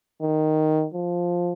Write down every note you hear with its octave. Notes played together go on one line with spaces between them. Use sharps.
D#3
F3